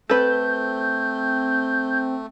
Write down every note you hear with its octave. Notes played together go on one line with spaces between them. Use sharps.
A3 C4 A4 B4 G6